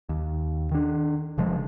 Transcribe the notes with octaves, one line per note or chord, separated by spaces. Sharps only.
D#2
D#3 D4
F1 C#3 F3 G#3